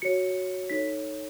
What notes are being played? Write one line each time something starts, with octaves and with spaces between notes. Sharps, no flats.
F#4 C#5 C#7
D#4 A4 C#5 B6